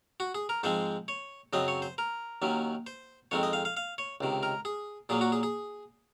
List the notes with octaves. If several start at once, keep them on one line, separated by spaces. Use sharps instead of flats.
F#4
G#4
A#4
G#2 F3 G#3 C4 C5
C#5
F#2 C#3 F#3 C4 D#5
C#5
C5
A#4
D#2 D#3 F#3 C#4
C5
F2 D#3 G#3 C4 C#5
D#5
F5
F5
F5
C#5
C#2 C3 D#3
A#4
G#4
A#2 F#3 A#3 G#4
F#4
G#4
G#4